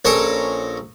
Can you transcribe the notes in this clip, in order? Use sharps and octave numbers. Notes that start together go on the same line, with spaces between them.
A#1 C#4 A4 A#4 A5 A#5